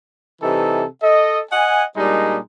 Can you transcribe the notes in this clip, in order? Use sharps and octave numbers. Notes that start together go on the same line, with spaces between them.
C3 E3 G3 D#4 A4
A4 D#5
D#5 F#5 G#5
A#2 G3 G#3 D4 D#4